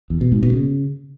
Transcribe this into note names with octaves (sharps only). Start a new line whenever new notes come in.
E2
B2
G#2
B2
C#3